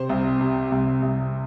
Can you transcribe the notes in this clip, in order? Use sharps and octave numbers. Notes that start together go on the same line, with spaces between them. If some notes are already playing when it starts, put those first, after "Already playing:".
Already playing: C3 C5
C2
C3
C2
C2